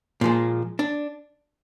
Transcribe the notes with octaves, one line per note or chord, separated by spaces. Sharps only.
A#2 F3 G#3
D4